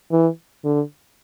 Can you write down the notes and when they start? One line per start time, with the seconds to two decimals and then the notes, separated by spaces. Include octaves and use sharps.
0.11 E3
0.65 D3